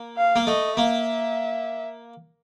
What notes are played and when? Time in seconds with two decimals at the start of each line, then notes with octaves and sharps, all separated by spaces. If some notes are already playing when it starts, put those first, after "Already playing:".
Already playing: A#3
0.17 F5
0.36 A#3
0.47 A3 D#5
0.77 A#3 E5